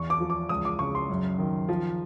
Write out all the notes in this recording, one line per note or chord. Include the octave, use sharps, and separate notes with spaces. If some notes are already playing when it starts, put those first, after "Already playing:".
Already playing: E2 C#6
D6
F3
D6
C#2 D#6
D6
C#3 C#6
C6
F#2
D#3
F3